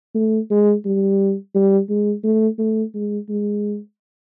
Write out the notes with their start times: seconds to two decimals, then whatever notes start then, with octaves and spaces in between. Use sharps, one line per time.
0.15 A3
0.50 G#3
0.85 G3
1.55 G3
1.90 G#3
2.24 A3
2.59 A3
2.94 G#3
3.29 G#3